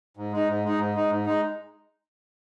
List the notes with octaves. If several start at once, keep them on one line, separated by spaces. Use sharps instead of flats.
G#2
G#3 D#4
G#2
G#3 D#4
G#2
G#3 D#4
G#2
G#3 D#4